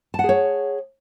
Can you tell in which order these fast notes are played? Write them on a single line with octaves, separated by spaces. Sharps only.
A5 F#5 G#4 C#5